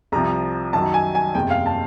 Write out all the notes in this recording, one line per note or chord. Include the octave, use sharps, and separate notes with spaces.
C2 C3 F3 A#5
F#2 D#3 F#3 A5
G#5
G#5
F#1 E2 C3 G5
F5
A5